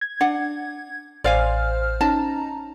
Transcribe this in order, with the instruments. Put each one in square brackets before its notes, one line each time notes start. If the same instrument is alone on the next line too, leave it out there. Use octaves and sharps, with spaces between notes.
[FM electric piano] G#6
[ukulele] D4 F#5
[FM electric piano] A1 C5 F6 [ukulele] D5 F5 G#5
[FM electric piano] C#4 D#4 A#5 [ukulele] A5